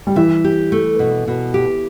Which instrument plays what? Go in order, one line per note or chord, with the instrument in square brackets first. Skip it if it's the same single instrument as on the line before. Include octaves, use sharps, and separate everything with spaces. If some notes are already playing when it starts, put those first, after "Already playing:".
[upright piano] G3
[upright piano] E3 [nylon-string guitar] E5
[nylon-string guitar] G4
A3
B2
B2
G4